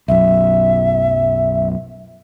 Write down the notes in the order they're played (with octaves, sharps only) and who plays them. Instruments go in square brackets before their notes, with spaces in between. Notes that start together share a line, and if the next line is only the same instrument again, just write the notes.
[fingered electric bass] B1 F#2 [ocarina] E5